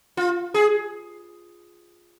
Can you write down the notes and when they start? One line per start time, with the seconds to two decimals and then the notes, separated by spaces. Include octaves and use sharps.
0.17 F4
0.54 G#4